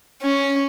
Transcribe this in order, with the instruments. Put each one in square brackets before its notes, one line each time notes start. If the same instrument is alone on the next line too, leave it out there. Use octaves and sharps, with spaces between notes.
[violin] C#4